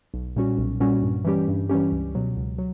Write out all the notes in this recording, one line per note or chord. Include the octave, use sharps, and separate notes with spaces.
B1
A#2 G3 C#4 F#4
B1
A#2 G3 C#4 F#4
G2
E3 G3 C#4 G4
G2
E3 G3 C#4 G4
C#2
B2 F#3
C#2
F#3